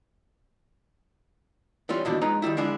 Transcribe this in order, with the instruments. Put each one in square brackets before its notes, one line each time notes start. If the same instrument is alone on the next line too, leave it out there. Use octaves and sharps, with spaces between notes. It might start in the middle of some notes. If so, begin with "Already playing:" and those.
[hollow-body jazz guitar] E3 G3 C#4 F4
D#2 B2 E3 D4
G#3 D#4 F4 B4 A#5
D#3 F3 G3 E4
D3 G#3 D4 E4 F4